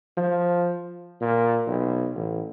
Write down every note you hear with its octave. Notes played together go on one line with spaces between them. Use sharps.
F3
A#2
B1
A1